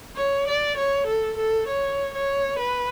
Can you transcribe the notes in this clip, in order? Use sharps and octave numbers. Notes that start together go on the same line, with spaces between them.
C#5
D5
C#5
A4
A4
C#5
C#5
B4